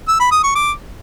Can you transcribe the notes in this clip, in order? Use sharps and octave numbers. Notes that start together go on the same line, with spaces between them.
E6
B5
D#6
C#6
D6